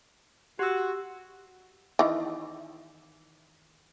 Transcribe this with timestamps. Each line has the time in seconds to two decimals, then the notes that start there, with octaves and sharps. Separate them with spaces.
0.59 F#4 G4 E6
1.99 D#3 E3